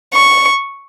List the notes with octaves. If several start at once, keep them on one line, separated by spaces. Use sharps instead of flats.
C#6